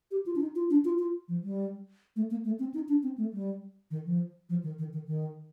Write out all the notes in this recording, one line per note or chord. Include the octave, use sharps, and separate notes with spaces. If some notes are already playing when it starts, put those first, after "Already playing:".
G4
F4
D4
D#4
F4
D4
F4
F4
F3
G3
A3
A#3
A3
C4
D#4
D4
C4
A3
G3
D#3
F3
F3
D#3
D#3
D#3
D#3